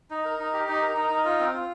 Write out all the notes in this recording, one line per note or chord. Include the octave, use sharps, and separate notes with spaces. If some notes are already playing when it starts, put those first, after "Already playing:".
D#4
A#4
D#4
G4
D#4
A#4
D#4
D#4
F4
C4
F4